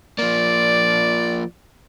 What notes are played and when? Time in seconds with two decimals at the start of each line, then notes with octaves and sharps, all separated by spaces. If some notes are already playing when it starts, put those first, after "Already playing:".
0.19 F3 A#3 D5